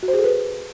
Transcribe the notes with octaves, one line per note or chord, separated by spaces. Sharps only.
F#4
C5
G#4
A4
B4